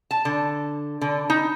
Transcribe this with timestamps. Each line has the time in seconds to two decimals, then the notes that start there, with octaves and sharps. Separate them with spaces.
0.11 A5
0.25 D3
1.01 D3
1.30 D#4